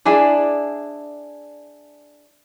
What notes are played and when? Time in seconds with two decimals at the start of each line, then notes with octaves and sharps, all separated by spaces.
0.05 D4 E4 G#4 D5